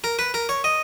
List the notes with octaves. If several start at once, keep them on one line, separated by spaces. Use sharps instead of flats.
A#4
B4
A#4
C#5
D#5